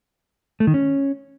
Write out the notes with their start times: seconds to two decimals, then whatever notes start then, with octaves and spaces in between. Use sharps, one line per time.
0.60 A3
0.67 D#3
0.74 C#4